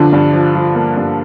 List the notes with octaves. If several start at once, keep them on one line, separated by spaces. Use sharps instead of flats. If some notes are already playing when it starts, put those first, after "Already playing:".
Already playing: D3 F3 D4
G2
F3
F3
A#3
G2